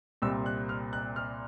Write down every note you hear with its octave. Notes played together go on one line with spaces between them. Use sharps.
C2 A#2 G3 C4 E6
F#6
F6
F#6
F6